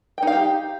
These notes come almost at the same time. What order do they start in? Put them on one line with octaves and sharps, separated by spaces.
G5 D#4 F5 G4